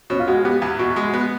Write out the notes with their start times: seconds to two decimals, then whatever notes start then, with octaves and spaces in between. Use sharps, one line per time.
0.10 B2 C#4
0.19 F4
0.27 G#3 F#4
0.44 B3 G4
0.62 E2
0.79 B2 F#4
0.96 G#3
1.02 F#4
1.13 B3